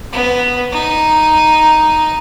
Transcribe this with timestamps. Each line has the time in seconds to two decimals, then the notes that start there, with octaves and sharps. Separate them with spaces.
0.12 B3
0.72 D#4